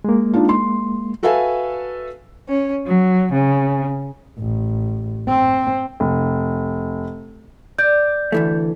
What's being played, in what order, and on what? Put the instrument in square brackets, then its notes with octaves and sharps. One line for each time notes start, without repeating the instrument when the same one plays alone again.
[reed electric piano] G#3 A#3
[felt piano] D4 D#4 F4
C6
F#4 A4 B4 E5 F5 G#5
[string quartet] C#4
F#3
C#3
[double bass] A1
C4
[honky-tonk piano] F1
[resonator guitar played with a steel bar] D5 [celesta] G6
[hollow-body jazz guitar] D2 E3 A3